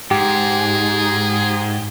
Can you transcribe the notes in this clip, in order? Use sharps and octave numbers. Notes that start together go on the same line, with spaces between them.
G#2 G4 G#4